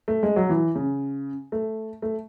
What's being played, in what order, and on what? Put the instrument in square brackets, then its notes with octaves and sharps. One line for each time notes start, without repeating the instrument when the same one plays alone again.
[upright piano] A3
G#3
F#3
E3
C#3
A3
A3